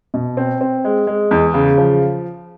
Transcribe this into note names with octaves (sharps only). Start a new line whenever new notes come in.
B2
C4
C4
G#3
G#3
E2
C#3
F3